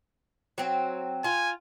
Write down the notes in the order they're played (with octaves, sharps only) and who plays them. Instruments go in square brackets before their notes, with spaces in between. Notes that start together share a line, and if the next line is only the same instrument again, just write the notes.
[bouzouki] F#3 C4
[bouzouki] F4 [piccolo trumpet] G#5